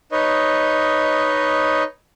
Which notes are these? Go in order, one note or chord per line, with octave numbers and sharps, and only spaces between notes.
D#4 B4 C#5 D#5